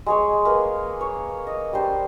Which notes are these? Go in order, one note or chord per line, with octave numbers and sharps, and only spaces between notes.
G#3 G#4 C#5
A#3 B4
C#5
D#5
G3 D4 C5